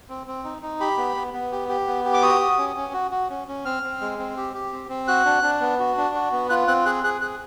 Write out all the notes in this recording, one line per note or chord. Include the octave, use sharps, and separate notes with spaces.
C4
C4
D#4
D#4
G4 B5
B3
B3
B3
G4
G4
B3
G4
D6
F#4 D#6
F#4
C#4
C#4
F#4
F#4
C#4
C#4
C4 F6
C4
G#3
C4
G4
G4
C4
C4
F#4 F#6
D4
D4
B3
F#4
D4
F#4
B3
F4 F#6
C4 F#6
G#4 F#6
G#4 F#6
G#4 F#6